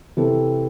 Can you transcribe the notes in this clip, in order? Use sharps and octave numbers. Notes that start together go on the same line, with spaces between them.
C3 E3 C4 A4